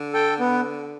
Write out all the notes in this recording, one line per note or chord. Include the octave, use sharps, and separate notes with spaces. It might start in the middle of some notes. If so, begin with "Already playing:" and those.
Already playing: D3
A4 G5
B3